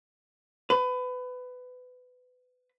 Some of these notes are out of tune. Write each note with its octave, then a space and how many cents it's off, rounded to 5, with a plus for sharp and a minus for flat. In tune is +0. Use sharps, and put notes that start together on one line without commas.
B4 +25